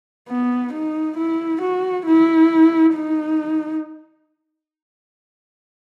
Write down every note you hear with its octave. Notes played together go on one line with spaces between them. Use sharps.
B3
D#4
E4
F#4
E4
D#4